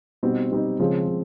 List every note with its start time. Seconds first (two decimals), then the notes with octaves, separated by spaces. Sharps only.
0.23 B2 G3 C4 D#4
0.51 B2 G3 C4 D#4
0.80 C#3 F3 G#3 C4
1.08 C#3